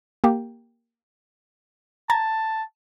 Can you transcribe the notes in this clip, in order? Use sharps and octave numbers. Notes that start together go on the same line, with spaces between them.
A#3 G4
A5 A#5 G#6 A6